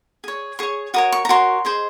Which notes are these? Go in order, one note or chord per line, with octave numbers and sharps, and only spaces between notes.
G#4 C#5
G#4 C#5 C#6
F#4 A#4 C#5 D#6
C#6
A#5
F#4 A#4 C#5 C6
G#4 C5 D#5